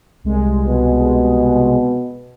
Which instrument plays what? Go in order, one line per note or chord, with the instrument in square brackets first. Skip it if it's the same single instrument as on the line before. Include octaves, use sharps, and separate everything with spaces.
[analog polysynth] C2 G#3
[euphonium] B2